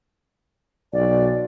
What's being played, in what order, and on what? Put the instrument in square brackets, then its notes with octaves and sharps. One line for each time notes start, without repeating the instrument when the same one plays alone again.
[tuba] B1 [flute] D5